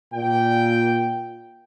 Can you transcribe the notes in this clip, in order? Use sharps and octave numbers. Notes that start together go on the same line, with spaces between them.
A#2 G5